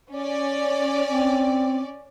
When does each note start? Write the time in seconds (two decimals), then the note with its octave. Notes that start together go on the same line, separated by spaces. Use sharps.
0.11 C#4 D5
1.09 C4